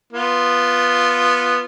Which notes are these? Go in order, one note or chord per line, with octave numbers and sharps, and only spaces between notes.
B3 F4